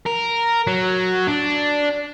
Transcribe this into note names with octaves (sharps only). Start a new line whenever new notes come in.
A#4
F#3
D4